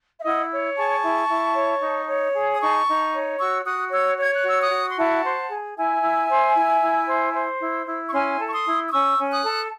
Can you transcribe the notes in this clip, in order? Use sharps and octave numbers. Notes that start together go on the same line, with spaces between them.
E5
E4 D#5 F#5
C#5
G#4 A5 C#6
E4
E4
C#5
D#4
C#5
G#4
D#6
D#4 A5 C#6
D#4
C#5
F#4 C#6 E6
F#4 D#6 F#6
C#5 E6 G#6
C#5 G#6
F#6
F#4 E6
D#6 F#6
F#4
C6
E4 F#5 A5
C5
G#4
E4 E5 G#5
E4
C5
E4
E4
C5
C5
E4
E4
C#6
C#4 G#5 C6
A4
C#6
C6 D#6
E4
D#6
C#4 C#6 E6
C#4
D#6 F#6
A4